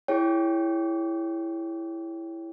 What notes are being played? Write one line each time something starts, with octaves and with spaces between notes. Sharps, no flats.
E4 G#4 C#5 G5